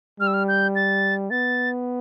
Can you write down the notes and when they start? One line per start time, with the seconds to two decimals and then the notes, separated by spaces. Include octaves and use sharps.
0.20 G3 F6
0.27 E6
0.34 F6
0.48 G6
0.76 A6
1.31 B3 A6